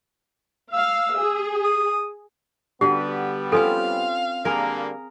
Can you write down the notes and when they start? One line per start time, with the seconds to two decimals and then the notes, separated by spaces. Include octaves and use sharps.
0.73 F5 E6
1.15 G#4
1.64 D#6
2.81 D3 G3 B3 F#4 G4 B4
3.52 C4 C#4 F4 A4 F5 G#5
4.45 D3 G3 A#3 G#4 A#4